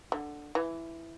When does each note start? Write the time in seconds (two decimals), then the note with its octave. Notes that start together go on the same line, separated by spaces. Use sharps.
0.12 D3
0.55 E3